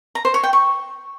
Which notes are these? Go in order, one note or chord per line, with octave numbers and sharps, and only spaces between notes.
A#5
C5
C#5
G5
C#6